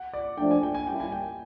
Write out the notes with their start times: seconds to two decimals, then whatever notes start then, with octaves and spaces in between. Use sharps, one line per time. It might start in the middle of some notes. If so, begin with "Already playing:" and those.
Already playing: F#5
0.13 D5
0.38 F3 A3 D4 G5
0.51 G#5
0.63 G5
0.74 G#5
0.87 G3 A#3 C#4 E4 G4 G5
1.00 G#5
1.12 G5